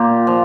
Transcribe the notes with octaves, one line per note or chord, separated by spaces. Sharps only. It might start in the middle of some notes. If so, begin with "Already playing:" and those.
Already playing: A#2 A#3 F4 G4
F3